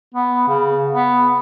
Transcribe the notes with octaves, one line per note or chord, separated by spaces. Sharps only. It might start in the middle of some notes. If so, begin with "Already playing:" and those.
B3
C#3
B3